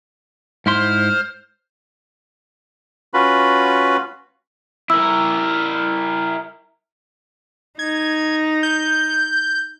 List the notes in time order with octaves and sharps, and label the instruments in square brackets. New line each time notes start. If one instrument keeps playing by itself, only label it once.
[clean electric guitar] G#2 E4 C6 [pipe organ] C5 F6
[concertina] C#4 F4 F#4 B4 B5
[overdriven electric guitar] E4 A#4 [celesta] E6
[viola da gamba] D#4 [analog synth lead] G#6
[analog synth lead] G6